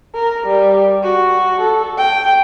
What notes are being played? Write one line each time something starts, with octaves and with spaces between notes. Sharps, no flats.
A#4
G3
F#4
A4
G5